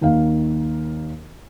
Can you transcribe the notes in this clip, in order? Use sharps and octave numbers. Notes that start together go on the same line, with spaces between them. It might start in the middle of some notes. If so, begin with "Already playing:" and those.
D#2 D#3 F5